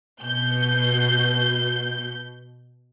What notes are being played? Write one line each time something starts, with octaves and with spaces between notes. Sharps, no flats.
B2 G6